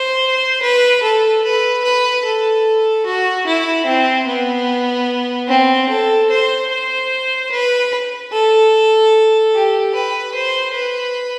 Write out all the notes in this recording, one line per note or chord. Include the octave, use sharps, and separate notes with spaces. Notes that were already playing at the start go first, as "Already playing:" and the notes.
Already playing: C5
B4
A4
B4
B4
A4
F#4
E4
C4
B3
C4
A4
C5
C5
B4
A4
G4
B4
C5
B4